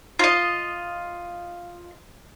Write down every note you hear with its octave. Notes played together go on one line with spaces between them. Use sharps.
F4 D#5